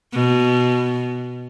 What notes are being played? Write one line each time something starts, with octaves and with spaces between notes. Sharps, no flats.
B2